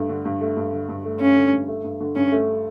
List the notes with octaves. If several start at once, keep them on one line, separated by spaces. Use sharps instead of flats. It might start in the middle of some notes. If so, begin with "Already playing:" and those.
Already playing: G2 A3
D3
G2
A3
G2
D3
G2
A3
G2 C#4
D3
G2
A3
G2
D3
G2 C#4
A3